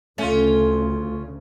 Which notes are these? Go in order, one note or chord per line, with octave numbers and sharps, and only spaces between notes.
D2 C#3 A3 C#4 F4